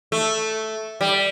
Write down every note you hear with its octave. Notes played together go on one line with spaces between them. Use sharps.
A3
G3